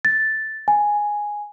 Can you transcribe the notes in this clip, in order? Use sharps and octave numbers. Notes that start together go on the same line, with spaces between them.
A6
G#5